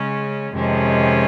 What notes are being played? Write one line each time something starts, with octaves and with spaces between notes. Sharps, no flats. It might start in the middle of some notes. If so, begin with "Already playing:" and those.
Already playing: C#3 G#3 C#4
F2 C3 D#3 G#3 C#4